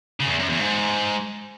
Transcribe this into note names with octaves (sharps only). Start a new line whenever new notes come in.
C#3
F#2
E2
F#2
E2
G#2